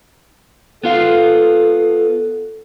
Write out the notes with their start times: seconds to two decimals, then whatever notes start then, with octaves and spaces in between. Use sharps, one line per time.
0.84 B3 F4 A4 F5